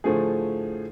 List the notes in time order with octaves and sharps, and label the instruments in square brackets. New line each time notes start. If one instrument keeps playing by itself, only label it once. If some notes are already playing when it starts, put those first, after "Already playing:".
[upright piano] A2 D3 F3 A3 G#4